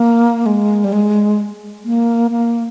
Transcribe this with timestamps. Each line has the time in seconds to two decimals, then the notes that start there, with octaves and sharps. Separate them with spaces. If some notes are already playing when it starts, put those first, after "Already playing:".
Already playing: A#3
0.46 G#3
0.84 G3
0.93 G#3
1.85 A#3
2.31 A#3